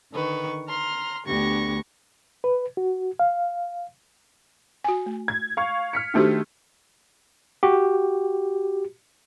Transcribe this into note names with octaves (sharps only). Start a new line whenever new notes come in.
D3 D#3 B4 C#6
A#5 C6 F6
D2 B3 D4 G4 C#6 A#6
B4
F#4
F5
F#4 G#5
A3
G#6
F5 C#6
F6 B6 C#7
D#3 A3 D4 F#4 G4 C5
F#4 G4